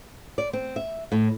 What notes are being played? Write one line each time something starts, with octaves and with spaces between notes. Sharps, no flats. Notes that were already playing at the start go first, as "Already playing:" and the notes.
D5
C4
E5
A2